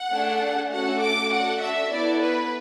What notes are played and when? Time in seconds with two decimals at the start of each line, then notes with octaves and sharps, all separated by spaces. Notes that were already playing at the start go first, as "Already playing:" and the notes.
Already playing: F#5
0.11 A3 D4 G#4
0.71 A3 C#4 F#4 A4 F#5
1.01 D6
1.31 D4 F#4 A4 F#5
1.61 E5
1.90 B3 E4 A4 D5
2.20 B4